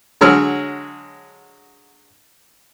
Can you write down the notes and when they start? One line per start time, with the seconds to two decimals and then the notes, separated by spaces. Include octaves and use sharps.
0.21 D3 F#3 G#3 C#5 E6 F6